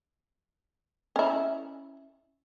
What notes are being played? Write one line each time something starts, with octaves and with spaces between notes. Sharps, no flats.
C#4 E4